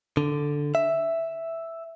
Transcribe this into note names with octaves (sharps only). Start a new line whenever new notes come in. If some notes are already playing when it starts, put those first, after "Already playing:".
D3
E5